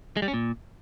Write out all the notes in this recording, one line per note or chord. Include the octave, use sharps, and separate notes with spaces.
G#3
G3
C#4
A#2